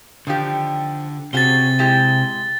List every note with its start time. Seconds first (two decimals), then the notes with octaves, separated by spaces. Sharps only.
0.27 D3 D#3 F3 G4
1.33 C3 C#4 F#4 G#4 A6 G7
1.79 G#3 E4 G4